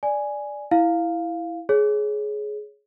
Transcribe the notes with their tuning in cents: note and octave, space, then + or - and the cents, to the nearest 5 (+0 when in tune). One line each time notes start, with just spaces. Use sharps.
D5 +0 G#5 +0
E4 +0 F5 +0
G#4 +15 C#5 +0